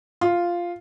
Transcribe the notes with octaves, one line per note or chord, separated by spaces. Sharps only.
F4